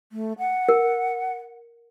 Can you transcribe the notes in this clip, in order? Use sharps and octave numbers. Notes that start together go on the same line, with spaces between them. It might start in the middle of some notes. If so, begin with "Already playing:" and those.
A3
F#5
A#4